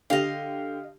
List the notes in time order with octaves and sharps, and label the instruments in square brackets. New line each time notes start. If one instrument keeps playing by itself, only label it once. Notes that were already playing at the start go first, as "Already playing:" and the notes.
[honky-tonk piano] D3 G4 [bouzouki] D#5 F5